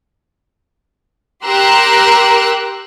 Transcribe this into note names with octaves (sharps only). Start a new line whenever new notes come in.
G4 A#4 A#5 C6 E6 F#6